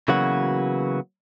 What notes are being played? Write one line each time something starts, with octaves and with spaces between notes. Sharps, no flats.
C#3 E3 F#3 A#3 B3 F#4